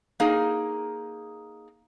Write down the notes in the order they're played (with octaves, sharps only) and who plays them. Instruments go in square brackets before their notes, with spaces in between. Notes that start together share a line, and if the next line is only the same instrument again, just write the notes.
[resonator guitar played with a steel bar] A#3 D#4 G#4